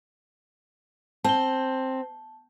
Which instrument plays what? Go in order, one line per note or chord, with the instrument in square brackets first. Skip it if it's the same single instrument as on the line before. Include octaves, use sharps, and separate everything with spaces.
[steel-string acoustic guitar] C4 [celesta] A5 G7